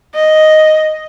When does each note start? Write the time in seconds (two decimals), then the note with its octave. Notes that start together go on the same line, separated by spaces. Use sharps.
0.15 D#5